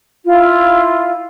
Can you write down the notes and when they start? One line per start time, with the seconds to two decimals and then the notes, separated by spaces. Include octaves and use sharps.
0.25 E4 F4